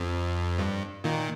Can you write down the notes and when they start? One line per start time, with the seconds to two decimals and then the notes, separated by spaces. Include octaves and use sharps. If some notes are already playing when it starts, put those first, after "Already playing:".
Already playing: F2
0.59 G2
1.04 A#2 D#3